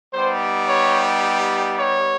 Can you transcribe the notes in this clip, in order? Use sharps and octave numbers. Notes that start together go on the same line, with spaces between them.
G3 B3 D#4 G4 C5
C#5
C#5